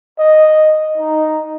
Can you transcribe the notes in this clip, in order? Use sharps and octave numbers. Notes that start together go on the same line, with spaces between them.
D#5
D#4